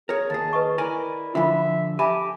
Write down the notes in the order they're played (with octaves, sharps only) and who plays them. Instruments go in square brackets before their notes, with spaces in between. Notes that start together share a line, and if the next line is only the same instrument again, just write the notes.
[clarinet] G#4 [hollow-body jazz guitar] A#4 C#5
[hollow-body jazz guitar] D#2 G#4 [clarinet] A5
[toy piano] B4 D#5 C#6
[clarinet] E4 [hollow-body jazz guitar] A#4 D5 G#5
[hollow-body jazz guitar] D3 F3 [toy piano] F4 G#5 B5 [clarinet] E5
[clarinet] G4 [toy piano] E5 B5 [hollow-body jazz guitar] G#5 A5